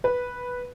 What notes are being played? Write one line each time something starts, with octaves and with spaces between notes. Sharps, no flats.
B4